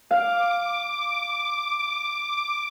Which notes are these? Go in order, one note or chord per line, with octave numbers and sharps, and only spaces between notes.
F5 D6